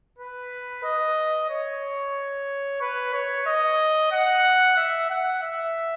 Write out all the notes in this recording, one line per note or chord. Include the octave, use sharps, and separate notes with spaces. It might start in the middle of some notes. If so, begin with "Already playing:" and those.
B4
D#5
C#5
B4
C#5
D#5
F#5
E5
F#5
E5